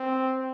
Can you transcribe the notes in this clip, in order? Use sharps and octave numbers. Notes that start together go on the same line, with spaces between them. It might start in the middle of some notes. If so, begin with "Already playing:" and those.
Already playing: C4